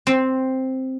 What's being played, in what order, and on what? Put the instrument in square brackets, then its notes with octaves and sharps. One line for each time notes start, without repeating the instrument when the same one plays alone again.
[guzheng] C4